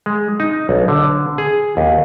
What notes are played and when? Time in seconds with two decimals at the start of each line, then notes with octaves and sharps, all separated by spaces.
0.06 G#3
0.40 D#4
0.69 B1
0.88 D3
1.38 G#4
1.77 D#2